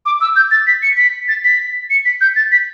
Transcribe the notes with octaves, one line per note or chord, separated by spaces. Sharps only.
D6
E6
G6
A6
B6
C#7
B6
A6
B6
C#7
B6
G6
A6
B6